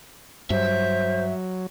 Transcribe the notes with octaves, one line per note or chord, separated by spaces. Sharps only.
G2 F#3 C5 E5